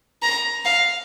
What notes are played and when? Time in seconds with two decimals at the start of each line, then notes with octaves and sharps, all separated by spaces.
0.22 A#5
0.65 F5